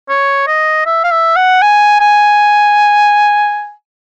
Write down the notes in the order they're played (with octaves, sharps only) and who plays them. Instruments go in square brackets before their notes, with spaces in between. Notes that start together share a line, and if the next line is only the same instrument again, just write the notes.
[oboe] C#5
D#5
E5
F5
E5
F#5
G#5
G#5